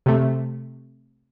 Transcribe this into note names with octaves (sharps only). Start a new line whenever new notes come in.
C3 A3